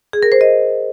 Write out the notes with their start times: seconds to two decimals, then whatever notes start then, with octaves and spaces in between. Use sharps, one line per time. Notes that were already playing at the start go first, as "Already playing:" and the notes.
0.13 G#4
0.23 A#4
0.32 C5
0.41 D#5